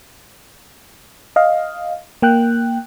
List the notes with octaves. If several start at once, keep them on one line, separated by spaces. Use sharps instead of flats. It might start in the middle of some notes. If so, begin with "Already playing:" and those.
D#5 F5
A#3 G5 F#6